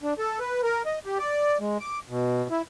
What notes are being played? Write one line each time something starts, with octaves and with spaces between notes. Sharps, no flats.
D4
A4
B4
A#4
D#5
G4
D5
G#3
D6
B2
E4